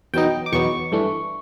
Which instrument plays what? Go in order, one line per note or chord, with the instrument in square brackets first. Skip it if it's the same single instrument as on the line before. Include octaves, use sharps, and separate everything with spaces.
[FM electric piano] E2 B2 F#3 B3 D#4 G5
D6
E2 B2 F#3 B3 D#4 C#6
G2 E3 A3 D4